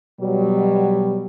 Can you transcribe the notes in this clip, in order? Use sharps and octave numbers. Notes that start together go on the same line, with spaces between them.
B2 F#3 G3